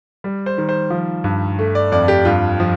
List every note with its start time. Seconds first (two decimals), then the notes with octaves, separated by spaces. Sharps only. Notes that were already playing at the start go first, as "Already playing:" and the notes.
0.24 G3
0.46 C5
0.58 D#3
0.69 C5
0.90 F3
1.24 G2
1.59 A3
1.75 D5
1.92 F2 D5
2.08 G4
2.25 G2 F4
2.60 F3